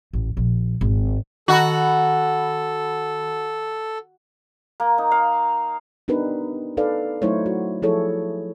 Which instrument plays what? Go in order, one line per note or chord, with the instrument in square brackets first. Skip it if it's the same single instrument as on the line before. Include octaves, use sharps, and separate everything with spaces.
[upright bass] A1
A#1
G#1
[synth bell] D#3 F#5 B5 [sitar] F#4 [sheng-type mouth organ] A4
[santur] A#3
D#4
F5
[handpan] B3 D4 D#4 G4 A#4 B4
D#4 A4 B4 D5 F5
F#3 A3 D#4 E4 C5 C#5
F#4
F3 E4 G#4 A4 C#5